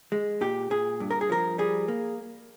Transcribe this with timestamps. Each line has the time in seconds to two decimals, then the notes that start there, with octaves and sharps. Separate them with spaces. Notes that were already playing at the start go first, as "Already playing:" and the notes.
0.12 G#3
0.41 A#2 G4
0.70 A#2 G#4
1.00 G2
1.11 A#4
1.21 G#4
1.30 F3 A#4
1.58 G3 G#4
1.88 A#3